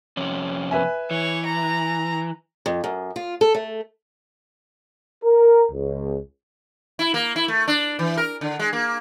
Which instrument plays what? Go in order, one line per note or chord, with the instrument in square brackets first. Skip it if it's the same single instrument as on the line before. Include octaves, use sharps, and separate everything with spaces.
[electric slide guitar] F2 C3 C#4
[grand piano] B4 E5 G#5
[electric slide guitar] E3 [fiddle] C#5
[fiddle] A#5
[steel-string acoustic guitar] F2
F#2
F4
A4
A3
[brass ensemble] A#4
C#2
[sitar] E4
A#3
E4
A3
D4
E3
A#4
D3
G#3
A#3